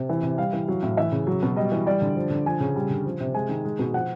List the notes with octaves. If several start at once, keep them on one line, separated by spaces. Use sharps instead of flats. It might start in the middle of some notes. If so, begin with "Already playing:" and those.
Already playing: C3
E3
C3
G3 F5
E3
F#3
A2
E3 E5
C#3
F#3
B2
G3 D#5
E3
G3 D5
D3
F3
D3
F3 G#5
C#3
G3
D3
F3
C3
G#3 G#5
D#3
G#3
B2
F3 F#5